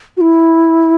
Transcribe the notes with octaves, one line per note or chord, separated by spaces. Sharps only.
F#4
E4